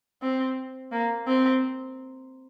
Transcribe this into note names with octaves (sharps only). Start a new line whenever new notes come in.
C4
A#3
C4